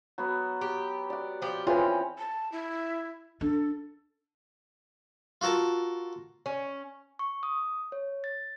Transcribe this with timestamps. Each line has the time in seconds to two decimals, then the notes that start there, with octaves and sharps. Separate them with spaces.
0.18 F#3 B3
0.61 G4
1.10 D5 F#5
1.42 F3 G4
1.67 E3 C4 C#4 F4 G#4 B4
2.18 A5
2.52 E4
3.41 D4 A4
5.41 F4 F#4 A4 A#4 A5
6.46 C#4
7.19 C#6
7.43 D#6
7.92 C#5
8.24 A6